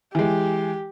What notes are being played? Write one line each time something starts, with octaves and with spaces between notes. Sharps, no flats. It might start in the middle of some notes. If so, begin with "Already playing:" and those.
E3 G#3 G4